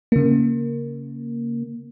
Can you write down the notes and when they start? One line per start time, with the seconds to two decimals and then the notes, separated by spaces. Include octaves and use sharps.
0.12 C#3 A#3